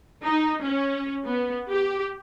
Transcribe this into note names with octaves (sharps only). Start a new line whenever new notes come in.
D#4
C#4
B3
G4